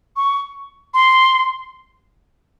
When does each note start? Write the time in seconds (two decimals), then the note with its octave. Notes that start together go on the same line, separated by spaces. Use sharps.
0.16 C#6
0.94 C6